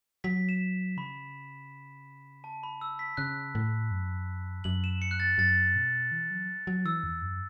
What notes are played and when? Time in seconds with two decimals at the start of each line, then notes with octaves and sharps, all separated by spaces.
0.24 F#3 B6
0.49 E7
0.97 C#3 B5
2.44 A5
2.63 B5
2.81 E6
2.99 B6
3.17 C#3 F#6
3.55 A2
3.91 F#2
4.64 F#2 F#7
4.84 E7
5.02 C#7
5.11 F#6
5.20 A6
5.38 F#2 A6
5.76 B2
6.12 E3
6.30 F#3
6.67 F#3
6.85 E3 E6
7.04 E2
7.22 F#2